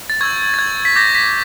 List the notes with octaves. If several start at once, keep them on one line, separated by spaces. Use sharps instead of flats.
A6
C#6 E6 G6 G#6
A6
G#6
B6
D6 G6 A#6
B6